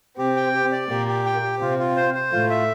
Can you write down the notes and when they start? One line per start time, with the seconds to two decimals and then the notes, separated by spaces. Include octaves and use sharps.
0.18 C3 C4 G4
0.36 G5
0.54 G4
0.72 D5
0.89 A#2 A#3 G4
1.07 G4
1.25 G5
1.43 G4
1.60 C3 C4 F4
1.79 F4
1.97 C5
2.14 C5
2.32 A2 A3 F4
2.50 E5